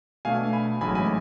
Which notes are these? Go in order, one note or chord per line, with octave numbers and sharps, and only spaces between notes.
B2 A3 D4 F5 G#5
G#5 B5
A1 G#2 F#3 A3 G#5 B5
G#5 B5